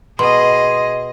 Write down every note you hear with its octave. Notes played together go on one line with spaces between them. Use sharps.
B2 G#4 D#5 C6